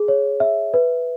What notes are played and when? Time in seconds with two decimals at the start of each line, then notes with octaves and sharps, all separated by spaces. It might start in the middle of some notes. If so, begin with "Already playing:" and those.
Already playing: G#4
0.08 C#5
0.40 E5
0.74 B4